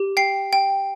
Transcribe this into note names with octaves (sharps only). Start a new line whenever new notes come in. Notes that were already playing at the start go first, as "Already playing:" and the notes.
Already playing: G4
G5 C7
G5